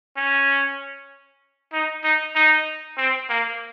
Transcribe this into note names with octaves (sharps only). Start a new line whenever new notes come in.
C#4
D#4
D#4
D#4
C4
A#3